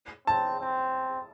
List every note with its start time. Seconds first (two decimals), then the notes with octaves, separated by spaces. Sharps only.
0.27 C4 A5
0.60 C4